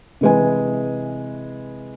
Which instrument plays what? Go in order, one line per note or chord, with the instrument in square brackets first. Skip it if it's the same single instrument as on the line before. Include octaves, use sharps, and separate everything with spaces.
[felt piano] C3 E3 G#3 B4 G#5